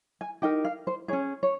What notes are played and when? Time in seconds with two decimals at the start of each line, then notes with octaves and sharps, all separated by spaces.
0.21 G#5
0.42 D#4 G4 A#4 G5
0.65 F5
0.87 C5
1.08 C#4 G#4 C#5
1.43 C#5